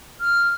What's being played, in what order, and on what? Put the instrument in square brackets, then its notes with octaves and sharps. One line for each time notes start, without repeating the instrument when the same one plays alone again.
[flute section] F6